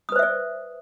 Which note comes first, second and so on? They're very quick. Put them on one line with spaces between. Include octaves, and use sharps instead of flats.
D#6 B4 C5 E5 D5